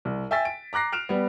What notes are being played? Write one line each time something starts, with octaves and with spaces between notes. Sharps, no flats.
C2
E5 G5 G#5 E6 A6 B6
D7
A#5 D6 F#6 A#6 C7
F6 F#6 D7 E7 F7
G3 B3